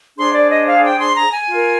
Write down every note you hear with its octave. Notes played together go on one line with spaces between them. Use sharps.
D4 G#4 C5 C6
D5
D#5
F5
G5
C6
A#5
G#5
F4 A#4